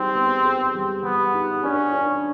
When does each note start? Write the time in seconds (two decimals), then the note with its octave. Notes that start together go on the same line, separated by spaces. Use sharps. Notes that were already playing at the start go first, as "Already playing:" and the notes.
Already playing: G3 C4 D#4 G#4
0.15 B3
0.45 G#4
0.75 G3
1.03 G3 B3
1.34 D#4
1.63 C#4 D4
1.93 D4